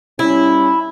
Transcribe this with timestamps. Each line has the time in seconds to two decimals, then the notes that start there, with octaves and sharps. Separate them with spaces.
0.19 G3 C#4 E4